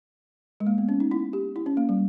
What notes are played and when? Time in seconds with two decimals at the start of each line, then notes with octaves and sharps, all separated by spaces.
0.60 G#3
0.66 A#3
0.78 B3
0.89 C#4
1.00 D#4
1.11 E4
1.33 G4
1.56 E4
1.66 C#4
1.77 A#3
1.89 G3